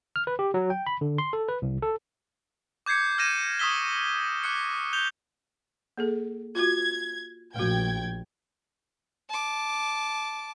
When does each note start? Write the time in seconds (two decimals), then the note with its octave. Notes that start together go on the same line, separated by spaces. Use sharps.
0.16 F6
0.27 B4
0.39 G4
0.54 F#3
0.70 G5
0.87 B5
1.01 D3
1.18 C6
1.33 A4
1.49 B4
1.62 C2
1.82 A4
2.86 D6 G6 G#6 C7 C#7
3.18 F6 G6 G#6 A#6 D#7 E7
3.59 C#6 D#6 E6 B6 G7
4.43 D6 F#6 C#7
4.93 G6 F7 G7
5.97 A#3 G#4 A4
6.55 F4 F#4 G#6
7.56 A#1 A3 F#4 G5 G#6
9.30 A5 D6